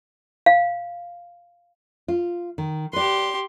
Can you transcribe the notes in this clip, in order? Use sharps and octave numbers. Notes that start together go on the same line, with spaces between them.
F5
F4
D#3
G4 B4 D5 C6